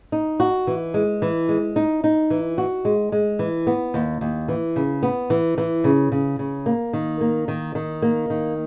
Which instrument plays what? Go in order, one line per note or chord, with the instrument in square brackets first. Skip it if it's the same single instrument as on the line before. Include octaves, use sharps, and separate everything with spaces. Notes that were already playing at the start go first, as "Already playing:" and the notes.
[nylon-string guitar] D#4
F#4
E3
G#3
E3
G#3
D#4
D#4
E3
F#4
G#3
G#3
E3
B3
D#2
D#2
E3
C#3
B3
E3
E3
C#3
C#3
C#3
A#3
D#3
A#3
D#3
D#3
A#3
D#3